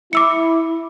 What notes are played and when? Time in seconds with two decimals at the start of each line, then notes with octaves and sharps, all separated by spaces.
0.13 E4 D6 E6 C#7